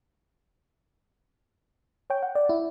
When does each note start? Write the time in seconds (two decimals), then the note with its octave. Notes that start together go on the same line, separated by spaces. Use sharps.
2.10 C#5 G5
2.23 F#5
2.35 D5
2.49 E4